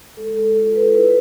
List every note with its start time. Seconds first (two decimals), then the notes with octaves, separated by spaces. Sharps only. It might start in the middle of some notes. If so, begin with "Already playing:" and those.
0.17 G#3 A4
0.36 G#3 A4
0.56 F4 A4
0.67 A4
0.75 F4 B4
0.95 E4 B4